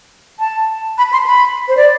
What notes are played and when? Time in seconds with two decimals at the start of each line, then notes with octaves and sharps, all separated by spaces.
0.40 A5
0.98 B5
1.13 C6
1.26 B5
1.68 C5
1.77 D5